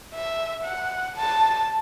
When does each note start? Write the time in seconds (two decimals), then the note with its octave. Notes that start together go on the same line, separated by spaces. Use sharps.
0.15 E5
0.64 F#5
1.16 A5